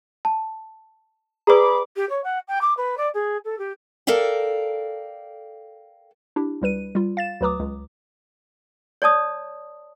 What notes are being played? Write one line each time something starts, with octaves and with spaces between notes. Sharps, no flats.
A5
G#4 B4 D5 A#5 B5 D6
G4
C#5
F#5
G5
D6
B4
D5
G#4
A4
G4
A4 A#4 D5 F5 G5
D4 E4 G4
C#2 G3 B4 D#7
G3 F4
F5 A6 E7
D2 F#3 B4 A#5 D6 D#6
C#2
C#5 D5 A5 D#6